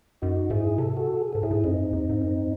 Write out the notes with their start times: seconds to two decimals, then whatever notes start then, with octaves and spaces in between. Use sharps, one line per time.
0.22 F#2 D#4 F#4
0.50 G#2 E4 G#4
0.78 C3 A4
0.97 F#4 A4
1.22 G#4
1.33 G#2 A4
1.43 A2 E4 G#4
1.51 G#2
1.64 F#2 C4 D#4
1.93 E2
2.09 G#2
2.21 F#2